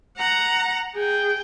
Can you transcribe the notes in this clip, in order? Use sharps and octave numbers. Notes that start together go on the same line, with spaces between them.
F#5 A#5
G#4 G5